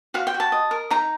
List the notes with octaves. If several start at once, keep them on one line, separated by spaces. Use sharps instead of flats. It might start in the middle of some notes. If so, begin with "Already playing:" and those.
F#4 F5
G5
F#4
A5
D#5
A#4
D#4 A#5